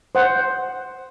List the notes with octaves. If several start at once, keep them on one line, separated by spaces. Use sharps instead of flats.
C5 F#5